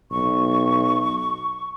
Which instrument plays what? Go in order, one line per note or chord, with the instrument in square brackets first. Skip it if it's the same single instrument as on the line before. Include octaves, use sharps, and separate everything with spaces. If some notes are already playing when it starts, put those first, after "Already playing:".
[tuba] B1 [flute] C#6